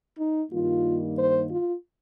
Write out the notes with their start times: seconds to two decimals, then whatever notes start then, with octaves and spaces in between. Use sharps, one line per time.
0.18 D#4
0.51 G2 D#3 G3 A#3 D#4 F4
1.17 C5
1.49 F4